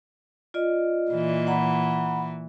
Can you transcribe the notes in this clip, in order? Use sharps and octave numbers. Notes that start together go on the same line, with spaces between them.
F4 D5 D#5
A#2 E3
F#5 A#5 B5